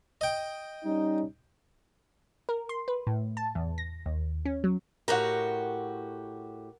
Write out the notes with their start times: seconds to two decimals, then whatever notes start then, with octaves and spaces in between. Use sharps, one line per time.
0.21 D#5 G5
0.84 G3 C#4 D#4
2.49 A#4
2.69 C6
2.88 B4
3.07 A2
3.37 A5
3.55 E2
3.78 A#6
4.06 D#2
4.45 C#4
4.64 F#3
5.08 A2 F#4 G4 A#4 F#5